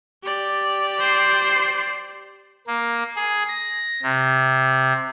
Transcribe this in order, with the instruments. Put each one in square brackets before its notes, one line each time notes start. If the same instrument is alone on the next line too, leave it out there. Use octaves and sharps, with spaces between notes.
[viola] G4 D5
[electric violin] C5 C7
[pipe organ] A#3
G#4
A#6
C3